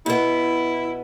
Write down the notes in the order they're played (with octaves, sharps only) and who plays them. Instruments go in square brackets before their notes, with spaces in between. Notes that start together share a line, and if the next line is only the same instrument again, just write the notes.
[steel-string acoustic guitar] B2 B3 [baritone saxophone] E4